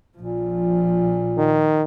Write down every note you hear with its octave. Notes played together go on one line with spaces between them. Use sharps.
A#1 A#2 F3
D#3